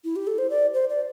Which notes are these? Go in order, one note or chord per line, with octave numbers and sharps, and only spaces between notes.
E4
G4
A4
C5
D5
C5
D5